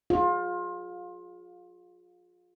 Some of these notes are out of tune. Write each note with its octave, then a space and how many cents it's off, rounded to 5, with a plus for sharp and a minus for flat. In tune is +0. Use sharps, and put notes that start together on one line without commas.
F4 +25 G#4 +0